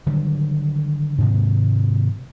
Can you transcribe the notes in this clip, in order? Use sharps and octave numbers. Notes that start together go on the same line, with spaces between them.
D3 D#3 F#3 G3
G#2 C3 D#3 G#3